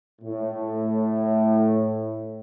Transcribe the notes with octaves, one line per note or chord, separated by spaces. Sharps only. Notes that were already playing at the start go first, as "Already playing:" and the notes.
A2